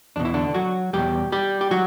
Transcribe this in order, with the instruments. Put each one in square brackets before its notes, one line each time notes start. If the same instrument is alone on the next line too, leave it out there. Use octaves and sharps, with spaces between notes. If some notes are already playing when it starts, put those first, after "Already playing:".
[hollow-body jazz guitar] E2 B2 D4
E4
D3 D4
F#3 F#4
E2 B2 G3 G4
G3 G4
G4
F#3 F#4